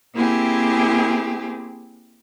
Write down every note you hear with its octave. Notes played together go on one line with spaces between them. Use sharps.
A#3 C4 E4 G4 G#4